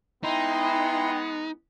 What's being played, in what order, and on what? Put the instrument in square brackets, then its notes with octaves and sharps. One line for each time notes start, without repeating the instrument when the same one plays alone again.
[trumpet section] G#3 B3 [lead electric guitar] D#4 [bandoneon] E4 A#5 C6 [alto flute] G5